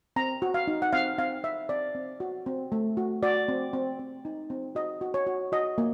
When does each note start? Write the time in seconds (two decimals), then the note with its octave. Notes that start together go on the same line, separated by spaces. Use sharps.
0.16 C4 A#5
0.42 F#4
0.54 F5
0.68 D#4
0.82 F#5
0.93 C4 F5
1.18 C4 F5
1.43 C4 E5
1.69 C4 D5
1.95 C4
2.20 F#4
2.46 C4
2.72 A3
2.97 F#4
3.23 F#4 D5
3.48 C4
3.73 C4
3.99 C4
4.25 D#4
4.50 C4
4.75 F#4 D#5
5.01 F#4
5.14 C#5
5.27 F#4
5.52 F#4 D#5
5.78 A#3